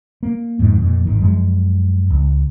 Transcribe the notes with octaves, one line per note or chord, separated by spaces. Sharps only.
A#3
F2 G#2 D#3
F2 A#2
G#1 D#3
F#2 F3 G#3
C#2